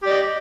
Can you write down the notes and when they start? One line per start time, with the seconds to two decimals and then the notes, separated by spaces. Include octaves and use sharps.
0.03 G4
0.06 D5
0.10 D#5